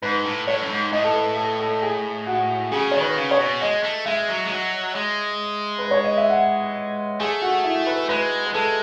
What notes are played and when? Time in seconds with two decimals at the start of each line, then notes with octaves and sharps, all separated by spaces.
0.02 G#2 B4
0.25 A2
0.47 A2 C#5
0.62 F#2
0.70 G#2
0.92 A2 D#5
1.04 A4
1.15 B4
1.37 A4
1.60 A4
1.82 G#4
2.27 F#4
2.72 C#3 G#4
2.91 D#3 C#5
3.01 B4
3.16 C#3
3.31 C#5
3.39 B2
3.61 G#3 D#5
3.83 A3
4.06 G#3 E5
4.28 F#3
4.44 G#3
4.50 F#3
4.95 G#3
5.79 B4
5.91 C#5
6.04 D#5
6.17 E5
6.30 F#5
7.20 A3 G#4
7.42 F#4
7.64 E4
7.87 B4
8.09 G#3 B4
8.46 B4
8.54 G#3 A4